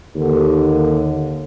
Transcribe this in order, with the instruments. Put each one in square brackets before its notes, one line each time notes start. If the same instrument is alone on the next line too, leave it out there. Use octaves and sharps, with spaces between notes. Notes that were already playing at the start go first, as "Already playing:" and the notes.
[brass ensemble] D#2 [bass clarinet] D3